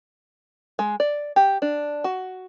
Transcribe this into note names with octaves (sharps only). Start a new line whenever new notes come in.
G#3
D5
G4
D4
F#4